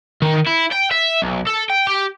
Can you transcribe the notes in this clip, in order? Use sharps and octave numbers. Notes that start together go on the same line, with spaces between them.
D#3
E4
G5
E5
B1
A4
G5
G4